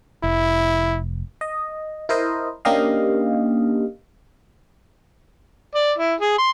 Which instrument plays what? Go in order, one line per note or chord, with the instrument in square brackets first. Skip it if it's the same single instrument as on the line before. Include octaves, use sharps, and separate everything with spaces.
[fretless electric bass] F1 [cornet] E4
[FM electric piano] D#5
E4 A#4 C5 D#5
A#3 C#4 D4 G4 D#5 F5
[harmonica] D5
E4
G#4
C6